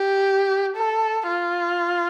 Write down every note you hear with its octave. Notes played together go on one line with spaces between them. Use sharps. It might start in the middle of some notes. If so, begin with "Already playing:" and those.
Already playing: G4
A4
F4